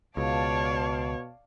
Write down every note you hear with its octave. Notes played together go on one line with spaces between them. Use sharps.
C#2 B2 C#5 D5 F5 A5